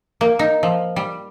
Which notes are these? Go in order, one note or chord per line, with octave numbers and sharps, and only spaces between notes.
A#3
D#4
F3
G3